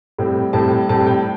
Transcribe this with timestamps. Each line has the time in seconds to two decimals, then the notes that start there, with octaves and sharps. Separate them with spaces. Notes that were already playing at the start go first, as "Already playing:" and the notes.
0.18 A2 G3 C4
0.53 A2 G3 C4 A5
0.89 A2 G3 C4 A5
1.06 G5